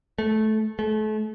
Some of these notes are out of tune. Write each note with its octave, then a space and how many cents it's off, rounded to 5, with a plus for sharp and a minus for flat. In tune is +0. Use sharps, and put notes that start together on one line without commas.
A3 -15
A3 -35